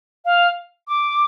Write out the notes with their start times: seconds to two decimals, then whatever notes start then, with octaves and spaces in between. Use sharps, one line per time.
0.25 F5
0.87 D6